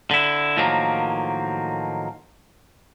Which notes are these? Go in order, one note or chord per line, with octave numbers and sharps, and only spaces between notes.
D3 E4
A2 D#3 F3 F#3 A#3